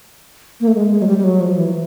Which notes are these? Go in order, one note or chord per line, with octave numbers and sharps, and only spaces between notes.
A#3
A3
G#3
G#3
F#3
G3
G3
F#3
F3
E3